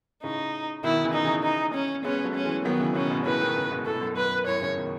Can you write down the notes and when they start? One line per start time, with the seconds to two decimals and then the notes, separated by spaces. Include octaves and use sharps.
0.24 A2 C#3 D#4
0.84 B2 D#3 E4
1.04 C#3 E3
1.14 D#4
1.24 C#3 E3
1.44 D#4
1.74 C#4
2.05 G#3 B3 C#4
2.24 F#3 A3
2.35 C#4
2.45 E3 G#3
2.65 D#3 F#3 B3
2.81 C#3 E3
2.95 B2 D#3 C#4
3.10 G#2 B2
3.26 A2 C#3 B4
3.41 B2 D#3
3.56 A2 C#3
3.71 G#2 B2
3.86 A2 A4
3.94 B2
4.01 F#2 A2
4.17 F#2 B4
4.47 F#2 A2 C#5
4.61 A2 C#3
4.77 B2 D#3